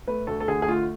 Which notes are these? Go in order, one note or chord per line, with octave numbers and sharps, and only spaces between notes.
A3 B4
D2 A4
A4
D3 G#4
G#4
A3 F4